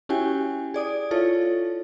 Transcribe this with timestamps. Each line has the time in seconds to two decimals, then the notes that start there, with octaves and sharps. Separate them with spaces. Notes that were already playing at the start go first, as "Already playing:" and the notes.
0.09 C#4 E4 F#4 G4 G5 G#5
0.74 G#4 D5 D#6
1.11 E4 F4 A4 C#5